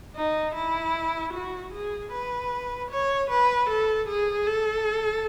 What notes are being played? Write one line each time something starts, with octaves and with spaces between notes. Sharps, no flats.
D#4
E4
F#4
G#4
B4
C#5
B4
A4
G#4
A4